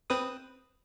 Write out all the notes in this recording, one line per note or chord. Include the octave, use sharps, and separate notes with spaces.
C4 B4 D#6